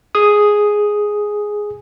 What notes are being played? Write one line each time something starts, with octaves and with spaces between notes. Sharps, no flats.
G#4 D#6